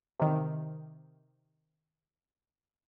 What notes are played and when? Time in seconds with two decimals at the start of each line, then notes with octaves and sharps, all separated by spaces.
0.20 C3 D#3